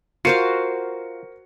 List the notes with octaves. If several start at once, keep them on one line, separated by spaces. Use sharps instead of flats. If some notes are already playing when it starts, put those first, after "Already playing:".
F4 F#4 A#4 C5 F5 C#7